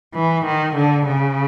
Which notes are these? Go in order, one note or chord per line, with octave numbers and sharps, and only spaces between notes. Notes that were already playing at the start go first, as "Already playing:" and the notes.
E3
D#3
D3
C#3